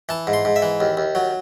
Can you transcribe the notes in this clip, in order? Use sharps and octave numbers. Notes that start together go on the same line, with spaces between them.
E3 A5
G#2
C6
G#2
E5
E3
D#2
D#2
F#3